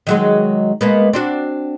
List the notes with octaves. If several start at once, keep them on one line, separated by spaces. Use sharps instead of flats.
D#3 F#3 G#3
G#3 A#3 B3
C4 D4 F#4